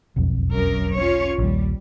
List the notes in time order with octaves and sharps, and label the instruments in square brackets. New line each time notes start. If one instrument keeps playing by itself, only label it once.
[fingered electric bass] E1 B1 F2
[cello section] F#2 A#4
C#4 F4 C#5
[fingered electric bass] A#1 D#2 [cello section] G3